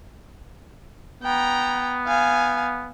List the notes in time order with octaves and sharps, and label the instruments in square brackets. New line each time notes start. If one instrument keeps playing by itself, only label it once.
[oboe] B3 [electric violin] G5 A#5
[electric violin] F5 G#5